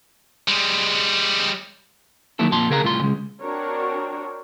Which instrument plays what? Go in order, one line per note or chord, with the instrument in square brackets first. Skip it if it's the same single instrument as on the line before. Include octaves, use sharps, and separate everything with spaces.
[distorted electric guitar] G3 G#3
[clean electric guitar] D#3 F#3 A3 A#3 E4 A4
F2 A#2 A5 C6
C#3 G#4 A#4 F5 G#5 A#5
C2 A2 F4 C6
C#3 G#3
[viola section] C4 D4 F#4 A#4 C#5